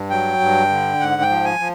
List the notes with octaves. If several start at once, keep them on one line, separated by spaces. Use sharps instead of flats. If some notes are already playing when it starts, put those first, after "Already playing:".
Already playing: G2
F#3 G5
G2
D3
G#2 F#5
G5
F3
G#5
F3